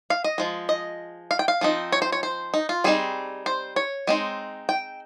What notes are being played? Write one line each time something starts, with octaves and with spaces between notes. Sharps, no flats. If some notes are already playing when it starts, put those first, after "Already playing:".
F5
D#5
F3 G#3
D#5
F5
G5
F5
F3 C4 D#4
C#5
C5
C#5
C5
D#4
F4
G3 C4 D#4 G#4
C5
C#5
G#3 C4 D#4
G5